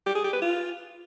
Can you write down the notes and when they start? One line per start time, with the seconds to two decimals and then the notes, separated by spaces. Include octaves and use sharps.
0.06 G4
0.15 G#4
0.24 G4
0.33 B4
0.42 F4